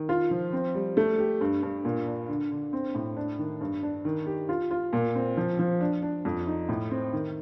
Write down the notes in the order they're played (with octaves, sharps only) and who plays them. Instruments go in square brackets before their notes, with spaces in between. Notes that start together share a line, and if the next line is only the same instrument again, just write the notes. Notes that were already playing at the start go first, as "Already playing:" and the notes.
Already playing: [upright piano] D#3
F4
F3
C4
G3
A3
G4
G2
G2
A#2
D4
D3
D3
C4
A2
D4
D#3
G2
D4
D#3
G4
F4
F4
A#2
C4
F3
F3
D4
D4
F2
D#4
A2
C4
D#3